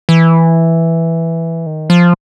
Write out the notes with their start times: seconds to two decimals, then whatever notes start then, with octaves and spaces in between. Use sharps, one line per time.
0.09 E3
1.66 D#3
1.90 F3